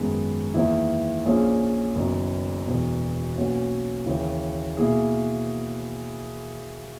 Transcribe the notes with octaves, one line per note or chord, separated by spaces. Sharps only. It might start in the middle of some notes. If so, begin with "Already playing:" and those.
Already playing: G#1 F#2 D#3 G#3 B3
E2 D#3 A#3 E4
A#1 A#2 A#3 C#4 G#4
F#1 F#2 D#3 F#3 B3
E1 E2 B2
B1 B2 A#3 C#4 F#4
D#2 C#3 E3
B2 A#3 E4 G#4